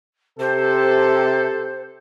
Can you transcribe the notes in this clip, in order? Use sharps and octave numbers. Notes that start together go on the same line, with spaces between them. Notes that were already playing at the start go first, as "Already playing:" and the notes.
C3 G4 A4 C5